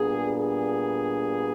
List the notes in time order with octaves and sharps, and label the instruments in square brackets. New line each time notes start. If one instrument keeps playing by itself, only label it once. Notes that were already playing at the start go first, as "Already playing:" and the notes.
Already playing: [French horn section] A#2 G3 B3 D4 G#4
G#4